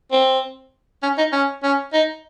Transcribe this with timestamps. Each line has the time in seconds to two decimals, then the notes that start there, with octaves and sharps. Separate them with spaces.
0.12 C4
1.03 C#4
1.18 D#4
1.33 C#4
1.63 C#4
1.93 D#4